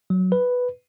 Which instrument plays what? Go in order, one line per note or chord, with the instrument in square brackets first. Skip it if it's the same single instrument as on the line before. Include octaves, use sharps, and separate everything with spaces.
[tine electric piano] F#3
B4